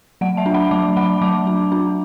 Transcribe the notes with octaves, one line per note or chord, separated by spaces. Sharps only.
F#3 F#5
E5 A5
D4
F#5 B5
F#3 A5 D6
F#3 F#5 B5
F#3 A5 D6
D4
D4